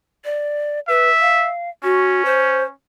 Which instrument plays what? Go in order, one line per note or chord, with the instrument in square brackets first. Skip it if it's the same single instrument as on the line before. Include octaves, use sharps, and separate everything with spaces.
[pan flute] D5
[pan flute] B4 [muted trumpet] E5
[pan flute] F5
[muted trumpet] C#4 [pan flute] F#4
[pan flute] C5